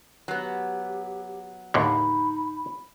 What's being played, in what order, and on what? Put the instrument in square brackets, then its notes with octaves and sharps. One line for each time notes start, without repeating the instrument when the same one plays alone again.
[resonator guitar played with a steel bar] F#3 B3 [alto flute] G4
[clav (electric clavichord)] D#2 A2 D3 [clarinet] D#4 [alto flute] B5